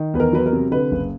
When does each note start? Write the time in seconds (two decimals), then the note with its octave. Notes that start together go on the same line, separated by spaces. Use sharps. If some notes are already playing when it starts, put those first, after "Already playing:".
Already playing: D#3
0.14 E2 B4
0.20 A#4
0.33 F#3 B4
0.46 A#4
0.53 C3
0.72 D3 B4
0.91 F#1